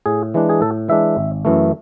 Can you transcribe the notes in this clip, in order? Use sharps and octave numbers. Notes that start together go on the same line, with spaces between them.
A2 G#4
E3 G#3 D4
G#4
A2 A4
E3 G#3 D4 E5
G#1
F#2 E3 A3